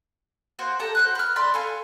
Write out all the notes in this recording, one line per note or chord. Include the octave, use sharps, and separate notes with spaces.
A#3 F#4 C5
G4 A4 A5 A#5
F#4 C5 F#6
B4 F6
D5 E5 B5 C6
A4 F5 G#5